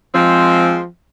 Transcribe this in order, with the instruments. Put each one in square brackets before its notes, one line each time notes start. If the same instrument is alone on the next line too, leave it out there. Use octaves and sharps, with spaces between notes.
[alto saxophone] F3 [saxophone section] G#3 C4